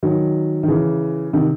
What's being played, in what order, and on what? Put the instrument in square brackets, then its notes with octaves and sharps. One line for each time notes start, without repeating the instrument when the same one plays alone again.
[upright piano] D#3 F#3
D#3
C#3 E3
C3 D#3